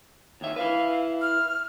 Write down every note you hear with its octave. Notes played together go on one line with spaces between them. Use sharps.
D#2 C#5 E5
E4 B4 F5
F6